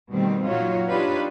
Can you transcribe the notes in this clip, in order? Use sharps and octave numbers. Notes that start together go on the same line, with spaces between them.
B2 D#3 G3 A3 C4
A#2 F#3 D#4 F4 F#4 C#5
D4 D#4 F4 G4 B4 C#5